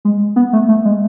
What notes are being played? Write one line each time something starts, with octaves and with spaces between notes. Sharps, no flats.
G#3
B3
A3
A3
G#3